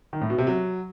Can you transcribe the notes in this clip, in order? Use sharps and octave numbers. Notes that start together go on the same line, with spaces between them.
D#3
A2
B2
C3
F#3